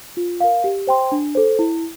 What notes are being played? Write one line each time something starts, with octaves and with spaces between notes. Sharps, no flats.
F4
A#4 F5
G4
C5 G5 C6
D4
A4 C5
E4